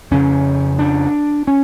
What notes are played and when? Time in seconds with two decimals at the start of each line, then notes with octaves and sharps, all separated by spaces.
0.11 F2 C#3 C#4
0.79 D4
1.47 C#4